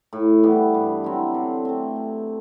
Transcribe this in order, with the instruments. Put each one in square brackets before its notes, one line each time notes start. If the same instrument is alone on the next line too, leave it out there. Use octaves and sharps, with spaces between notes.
[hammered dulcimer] A2
E3 G3 B3
G2
F#3 C4 E4
D3
A3 C4
C3